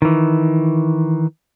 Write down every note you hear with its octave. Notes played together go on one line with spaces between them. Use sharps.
D#3 E3